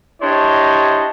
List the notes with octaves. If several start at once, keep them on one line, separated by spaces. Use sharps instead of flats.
D4 E4 G4 C5 C#5 D#5